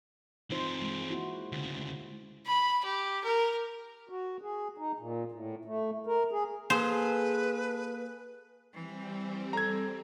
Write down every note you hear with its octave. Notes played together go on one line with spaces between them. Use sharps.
E3 C4 D#4 F4 C5
G#3
A#3 E4 F#4
D2 C#3
B5
G4
A#4
F#4
G#4
D#4
A#2
A2
A3
A#4
G#4
A#3 G#4 A4 B4 C5
E3 G3 C4
A4 A#5 G#6